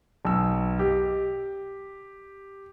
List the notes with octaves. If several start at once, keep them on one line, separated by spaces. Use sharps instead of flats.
B1 E6
G4